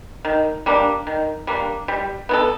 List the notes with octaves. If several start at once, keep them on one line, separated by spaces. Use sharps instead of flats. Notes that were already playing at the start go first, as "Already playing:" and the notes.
D#3
G3 A#3 D4
D#3
G3 A#3 D4
G3
B3 E4 A4